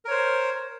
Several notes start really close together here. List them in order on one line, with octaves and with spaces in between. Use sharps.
A#4 C#5 C5